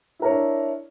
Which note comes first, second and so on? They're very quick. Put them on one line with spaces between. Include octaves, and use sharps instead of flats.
E4 A#4 C#5 D4 E5